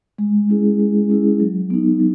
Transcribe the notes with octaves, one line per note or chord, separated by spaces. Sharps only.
G#3
C#4 E4 G#4
G#3
C#4 E4 G#4
F#3
B3 D#4
F#3